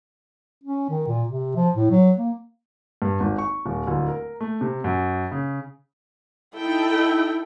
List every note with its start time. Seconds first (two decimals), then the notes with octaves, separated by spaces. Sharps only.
0.63 C#4
0.90 D#3
1.07 A#2
1.28 C3
1.56 F3
1.75 A2
1.91 F#3
2.18 A#3
3.02 G2
3.20 G#1
3.38 C#6
3.66 D#1
3.87 D1
4.08 A#4
4.41 A3
4.61 C3
4.84 F#2
5.32 C#3
6.56 D#4 E4 A4 G5